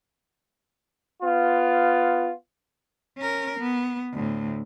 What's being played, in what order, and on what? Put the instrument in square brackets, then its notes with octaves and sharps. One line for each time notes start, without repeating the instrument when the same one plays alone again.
[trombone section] B3 F4
[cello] C#4 A#4
B3
D2 A2